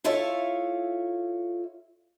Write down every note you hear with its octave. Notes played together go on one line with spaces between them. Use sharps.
E4 F4 A4 C#5 E5 F5